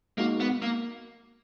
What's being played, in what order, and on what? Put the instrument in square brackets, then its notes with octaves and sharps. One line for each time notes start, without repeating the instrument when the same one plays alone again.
[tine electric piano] G#3 D#4 F#4 [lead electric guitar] A#3
[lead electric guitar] B3
A#3